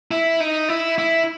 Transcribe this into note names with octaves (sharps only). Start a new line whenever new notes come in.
E4
D#4
E4
E4